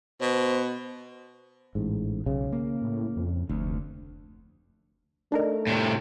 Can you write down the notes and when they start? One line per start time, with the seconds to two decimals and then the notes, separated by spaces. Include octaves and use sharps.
0.21 B2 C5
1.75 A1 G#2
2.26 B1 C#3
2.52 A#3
2.82 A2
3.16 F2
3.49 F1 D2
5.32 A3 D4 D#4 A#4
5.67 A2 C3